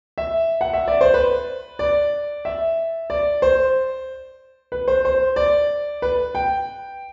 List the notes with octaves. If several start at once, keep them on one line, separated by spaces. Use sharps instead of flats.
E5
F#5
E5
D5
C5
B4
D5
E5
D5
C5
B4
C5
C5
D5
B4
G5